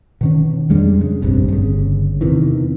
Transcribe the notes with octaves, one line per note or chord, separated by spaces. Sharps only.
B2 D#3 C#4
F2 G3 G#3 D4
C#3
F1 A#1 G2 C3
G1 C#3
E2 C3 D#3 E3